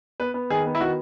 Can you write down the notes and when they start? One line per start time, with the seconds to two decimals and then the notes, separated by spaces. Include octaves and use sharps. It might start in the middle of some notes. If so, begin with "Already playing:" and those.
0.20 B3 B4
0.34 B3
0.50 D#3 G#4
0.66 B3
0.75 E4
0.81 D#3 F#4